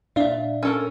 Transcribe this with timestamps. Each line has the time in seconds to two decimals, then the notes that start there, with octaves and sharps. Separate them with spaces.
0.16 A#2 D4 E5 F5
0.63 C#4 A4 A#4